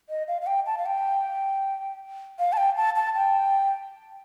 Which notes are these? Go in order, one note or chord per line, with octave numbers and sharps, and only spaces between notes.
D#5
F5
F5
G5
A5
F5
G5
F5
A5
G5
A5
A5
G5